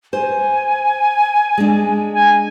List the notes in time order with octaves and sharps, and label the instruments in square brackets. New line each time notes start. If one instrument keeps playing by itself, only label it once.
[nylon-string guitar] C5 [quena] G#5
[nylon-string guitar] G#3 D4
[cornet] G#5